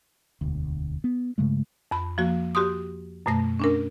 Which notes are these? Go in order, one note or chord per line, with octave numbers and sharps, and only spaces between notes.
E1 D2
B3
G2 C#3 G#3 A3
F2 B5
F3 A#3 F#4
F#4 G4 C6 D#6
F#2 B2 A3 A#6
C#4 D4 A#4